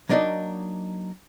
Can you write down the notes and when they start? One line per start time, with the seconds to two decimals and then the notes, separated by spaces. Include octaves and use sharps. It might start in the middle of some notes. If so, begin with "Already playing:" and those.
0.09 F#3 A#3 D4 D#4 D5 D#5